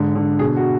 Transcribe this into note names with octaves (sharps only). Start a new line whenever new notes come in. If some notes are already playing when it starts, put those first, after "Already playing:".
Already playing: G#2 D3
D3
B2 G#4
F#4